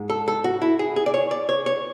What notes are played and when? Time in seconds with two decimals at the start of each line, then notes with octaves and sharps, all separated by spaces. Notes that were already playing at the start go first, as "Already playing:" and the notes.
Already playing: G#2 G#3
0.10 A4
0.28 A4
0.44 F#4
0.62 E4
0.79 G#4
0.96 G#4
1.06 D5
1.14 C#5
1.31 D5
1.49 C#5
1.66 C#5